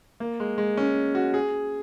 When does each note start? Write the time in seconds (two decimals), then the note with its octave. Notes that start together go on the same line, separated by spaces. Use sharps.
0.20 A#3
0.40 G#3
0.58 G#3
0.77 C#4
1.15 F#4
1.34 G#4